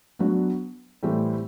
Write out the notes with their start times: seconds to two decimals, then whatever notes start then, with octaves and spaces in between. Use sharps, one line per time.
0.19 F#3 B3 D4 F#4
1.03 A2 E3 G3 C4